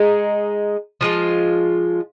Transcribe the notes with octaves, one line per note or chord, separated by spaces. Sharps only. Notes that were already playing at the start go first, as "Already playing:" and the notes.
Already playing: G#3 D#4 G#4
F3 G#3 F4